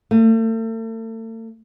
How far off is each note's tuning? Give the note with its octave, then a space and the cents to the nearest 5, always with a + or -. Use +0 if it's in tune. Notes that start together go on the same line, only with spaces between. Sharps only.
A3 +40